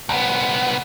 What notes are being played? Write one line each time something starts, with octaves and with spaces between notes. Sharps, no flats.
C2 B3